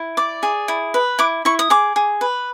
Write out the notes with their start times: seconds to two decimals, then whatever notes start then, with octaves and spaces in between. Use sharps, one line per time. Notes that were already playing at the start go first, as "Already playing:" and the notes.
Already playing: E4
0.17 D5 D6
0.43 G#4
0.68 E4
0.94 B4
1.19 E4 D6
1.45 E4 C#6
1.59 D#6
1.70 G#4 D6
1.96 G#4
2.21 B4